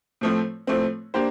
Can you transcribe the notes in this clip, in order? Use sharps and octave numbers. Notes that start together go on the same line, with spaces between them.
A2 F3 A3 C4
A2 F3 A3 C4
A#3 D4 G4 C5